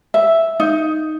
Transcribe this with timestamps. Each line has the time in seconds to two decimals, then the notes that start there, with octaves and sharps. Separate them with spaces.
0.14 E5
0.60 D#4